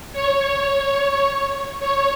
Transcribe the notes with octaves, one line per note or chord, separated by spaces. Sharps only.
C#5
C#5